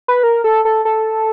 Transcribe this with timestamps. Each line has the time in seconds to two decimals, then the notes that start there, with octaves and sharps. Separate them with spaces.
0.08 B4
0.23 A#4
0.44 A4
0.65 A4
0.85 A4